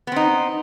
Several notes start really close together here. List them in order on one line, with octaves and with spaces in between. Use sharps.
B3 C4 D#4